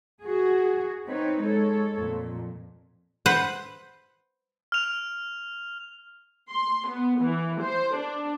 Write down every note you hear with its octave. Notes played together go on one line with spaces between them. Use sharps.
F#4 G#4
C4 D#4 B4 C#5
G#3 A4 C#5
F2 A#2
B4 C5 F#5
F6 F7
C6
B3
E3
C5
D4